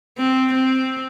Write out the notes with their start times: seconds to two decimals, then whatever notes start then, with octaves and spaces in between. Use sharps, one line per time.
0.18 C4
0.54 C4